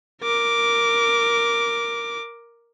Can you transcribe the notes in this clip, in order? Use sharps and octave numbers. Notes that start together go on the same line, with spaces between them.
A#4 D6